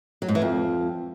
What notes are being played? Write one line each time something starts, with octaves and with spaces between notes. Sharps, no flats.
F#3
G#2
E3
F2